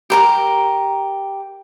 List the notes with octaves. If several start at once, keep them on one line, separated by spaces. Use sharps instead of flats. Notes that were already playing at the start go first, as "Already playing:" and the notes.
G4 A#4 A#5